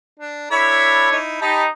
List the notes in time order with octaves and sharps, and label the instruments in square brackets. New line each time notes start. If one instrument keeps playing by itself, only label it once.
[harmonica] D4
[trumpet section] D4 A4 C#5 [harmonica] E4 B5
[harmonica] D#4 E4
[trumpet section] D#4 [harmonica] G4 A5 B5